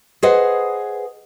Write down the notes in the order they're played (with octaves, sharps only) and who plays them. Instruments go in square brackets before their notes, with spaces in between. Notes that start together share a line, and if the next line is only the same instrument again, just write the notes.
[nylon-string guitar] G#4 B4 C5 D#5 F#5